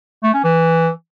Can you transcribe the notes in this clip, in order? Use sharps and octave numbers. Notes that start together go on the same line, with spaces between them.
A3
C#4
E3